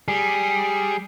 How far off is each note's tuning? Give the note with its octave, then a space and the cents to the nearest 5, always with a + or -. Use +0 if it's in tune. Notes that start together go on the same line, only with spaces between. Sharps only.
G3 +0 G#4 +0